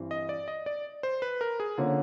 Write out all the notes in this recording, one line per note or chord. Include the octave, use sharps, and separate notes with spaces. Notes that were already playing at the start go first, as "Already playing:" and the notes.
Already playing: G2 E3 C4
D#5
D5
D#5
D5
C5
B4
A#4
G#4
D3 F3 A#3 C#4